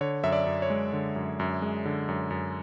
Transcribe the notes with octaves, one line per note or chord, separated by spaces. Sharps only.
D3 C#5
F#2 E5
D5
F#2
C#5
G#3
D3
F#2
F#2
G#3
D3
F#2
F#2